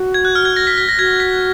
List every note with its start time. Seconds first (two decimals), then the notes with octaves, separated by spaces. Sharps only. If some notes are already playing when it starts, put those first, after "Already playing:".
Already playing: F#4
0.14 G#6
0.25 F#6
0.35 F6
0.45 G#6
0.56 A#6
0.67 B6
0.78 B6
0.89 A#6
0.98 F#4 G#6
1.20 B6